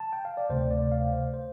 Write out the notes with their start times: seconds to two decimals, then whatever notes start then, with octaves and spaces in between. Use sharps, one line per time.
0.00 A5
0.13 G5
0.25 F5
0.37 D5
0.50 D2 C3 A3 C5
0.71 D5
0.92 F5
1.13 C5
1.34 C5